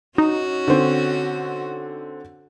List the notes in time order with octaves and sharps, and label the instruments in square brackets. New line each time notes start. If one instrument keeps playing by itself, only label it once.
[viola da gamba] C#4 F#4 [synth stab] D#4
[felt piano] D3 C4